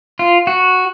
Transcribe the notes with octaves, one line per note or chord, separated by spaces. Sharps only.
F4
F#4